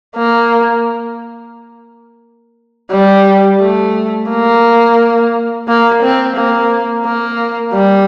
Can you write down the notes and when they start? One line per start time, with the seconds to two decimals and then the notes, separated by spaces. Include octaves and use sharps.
0.15 A#3
2.91 G3
3.60 A3
4.29 A#3
5.68 A#3
6.02 C4
6.36 A#3
7.05 A#3
7.74 G3